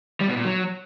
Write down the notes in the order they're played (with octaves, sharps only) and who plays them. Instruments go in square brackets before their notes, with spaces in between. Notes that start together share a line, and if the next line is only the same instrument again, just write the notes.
[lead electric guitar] G3
B2
A#2
F#3